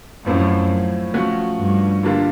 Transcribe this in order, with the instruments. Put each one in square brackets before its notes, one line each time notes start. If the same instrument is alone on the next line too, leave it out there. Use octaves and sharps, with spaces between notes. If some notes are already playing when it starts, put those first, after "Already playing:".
[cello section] F#2 [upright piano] A2 F3 A3 C4 E4
[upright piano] F3 A3 C#4 F#4
[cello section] G2
[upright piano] D3 G3 A#3 D4 F4